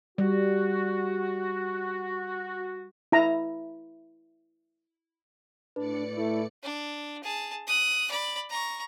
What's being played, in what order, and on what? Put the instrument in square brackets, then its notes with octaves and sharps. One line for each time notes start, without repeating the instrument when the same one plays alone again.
[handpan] G3 [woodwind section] F#4
[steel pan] E4 A#5
[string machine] A2 D5 C#7 [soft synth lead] D4 [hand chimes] B4
[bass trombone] A3 [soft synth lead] E4
[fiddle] D4
G#4 A5
D#6 F#6
D5 B5
A#5 C#6